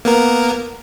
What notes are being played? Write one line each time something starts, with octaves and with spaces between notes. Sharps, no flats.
A#3 B3 A#4